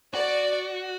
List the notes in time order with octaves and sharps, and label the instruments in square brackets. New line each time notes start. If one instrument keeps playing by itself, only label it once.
[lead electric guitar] F#4 [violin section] D5